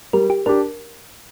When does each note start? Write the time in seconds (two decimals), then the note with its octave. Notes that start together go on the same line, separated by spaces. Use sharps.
0.13 G3 A#4
0.30 G4
0.46 D4 G4 A#4